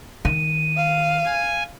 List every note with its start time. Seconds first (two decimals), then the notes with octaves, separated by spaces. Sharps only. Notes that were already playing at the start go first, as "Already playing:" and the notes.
0.25 D#3 D#7
0.77 F5
1.26 G#5